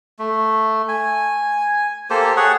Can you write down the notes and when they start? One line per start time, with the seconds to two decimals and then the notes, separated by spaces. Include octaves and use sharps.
0.19 A3
0.88 G#5
2.10 A#3 G4 A4 C5
2.37 G#4 C#5 F#5